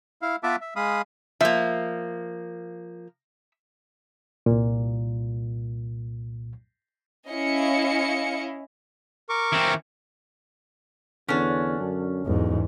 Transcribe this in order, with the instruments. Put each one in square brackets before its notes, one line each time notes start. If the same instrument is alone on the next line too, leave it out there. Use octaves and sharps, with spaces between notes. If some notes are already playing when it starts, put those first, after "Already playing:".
[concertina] E4 F5
B3 F4 B4 E5 A5 D6
E5
G#3 F5 B5 D#6
[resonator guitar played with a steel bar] F3 A#3 [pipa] E5
[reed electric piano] C2 A#2
[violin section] C#4 E4 D#5 F5 C#7
[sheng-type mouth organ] A#4 C#6 D6
[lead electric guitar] E3 C4
[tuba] E2 [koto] D3 D4 [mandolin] C#4
[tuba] F#2
[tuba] B1 [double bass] E2 G#2